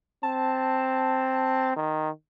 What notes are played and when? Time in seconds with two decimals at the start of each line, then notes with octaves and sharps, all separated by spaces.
0.23 C4 A5
1.76 D#3